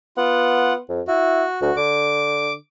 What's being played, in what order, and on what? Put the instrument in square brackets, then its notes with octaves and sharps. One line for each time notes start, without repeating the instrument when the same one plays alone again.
[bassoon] B3 [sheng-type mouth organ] F4 F#5
[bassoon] F2
[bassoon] E4 [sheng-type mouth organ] F#4
[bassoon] D2 [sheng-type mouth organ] F#4
[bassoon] D3 [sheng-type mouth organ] D6